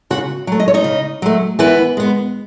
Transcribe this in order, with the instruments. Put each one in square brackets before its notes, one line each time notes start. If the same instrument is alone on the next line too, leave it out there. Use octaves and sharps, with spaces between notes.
[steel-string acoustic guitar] C#3 F#4 F#5
F#3 A3
D#5
C#5
D#4 D#5
C#3
F#3 A3
E3 B3 B4
G#3 B3